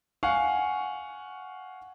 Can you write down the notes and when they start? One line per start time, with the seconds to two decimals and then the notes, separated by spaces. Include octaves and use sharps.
0.23 F5 F#5 G#5 C#6